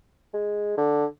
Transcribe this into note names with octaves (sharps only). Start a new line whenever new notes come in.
G#3
D3